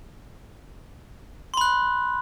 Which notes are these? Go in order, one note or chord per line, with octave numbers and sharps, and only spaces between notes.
B5 C6 F#6